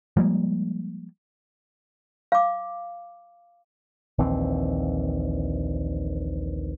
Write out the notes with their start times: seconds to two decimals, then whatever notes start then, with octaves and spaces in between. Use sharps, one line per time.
0.17 F3 G3 G#3 A#3
2.32 F5 D6
4.18 A#1 D#2 E3 C4